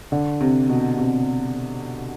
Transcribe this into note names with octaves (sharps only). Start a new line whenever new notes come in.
D3
C3
B2
C3